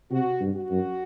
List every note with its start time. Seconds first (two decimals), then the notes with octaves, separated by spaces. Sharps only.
0.11 C3 F#4
0.40 G2
0.55 F#4
0.70 F#2